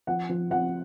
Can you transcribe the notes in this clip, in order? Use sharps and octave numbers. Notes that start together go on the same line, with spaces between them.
F3 F#5
F3
F3 F#5